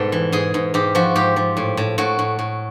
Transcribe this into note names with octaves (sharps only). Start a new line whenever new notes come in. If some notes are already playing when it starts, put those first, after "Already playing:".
Already playing: G#2 B2 G3 A4
E3
G#2 G#4
G#2
G#2 G4
F3 F#4
G#2 G4
F3
A2
A2
A2 F#4
A2
A2